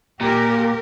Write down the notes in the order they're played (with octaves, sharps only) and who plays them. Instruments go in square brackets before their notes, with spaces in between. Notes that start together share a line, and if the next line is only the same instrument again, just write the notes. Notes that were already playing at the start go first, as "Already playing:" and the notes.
[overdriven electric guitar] A#2 [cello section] G4 A#4